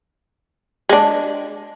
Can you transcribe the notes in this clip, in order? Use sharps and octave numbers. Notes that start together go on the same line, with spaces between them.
G#3 D4